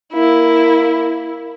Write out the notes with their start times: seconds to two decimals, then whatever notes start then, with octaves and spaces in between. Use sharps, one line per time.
0.12 A#3 E4